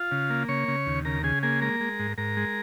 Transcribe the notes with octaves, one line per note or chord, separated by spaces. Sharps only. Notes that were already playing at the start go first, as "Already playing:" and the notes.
Already playing: F4 F5
C#3
A#3
C#3 C#5 C#6
C#3
D#2
C#3 A#4 A#5
C#3 G#4 G#5
A#3 G#4 G#5
G#3 A#4 A#5
G#3
G#2
G#2 A#4 A#5
G#3